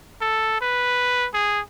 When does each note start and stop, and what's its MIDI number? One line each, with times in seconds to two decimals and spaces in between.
0.21 0.60 69
0.61 1.27 71
1.34 1.60 68